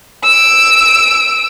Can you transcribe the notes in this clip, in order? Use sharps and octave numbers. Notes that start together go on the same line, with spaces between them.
E6 D7